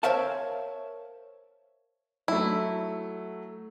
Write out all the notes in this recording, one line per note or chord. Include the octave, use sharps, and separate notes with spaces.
A#4 C5 C#5 E5 F5 A5
F#3 A3 E4